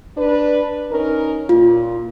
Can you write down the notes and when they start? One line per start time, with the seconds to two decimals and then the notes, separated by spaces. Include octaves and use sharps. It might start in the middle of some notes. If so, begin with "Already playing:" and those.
0.17 D4 B4
0.91 C#4 D#4 A#4
1.49 A#2 F4